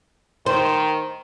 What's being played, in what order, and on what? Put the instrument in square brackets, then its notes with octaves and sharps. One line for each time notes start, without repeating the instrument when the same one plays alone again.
[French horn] D#3 [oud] C5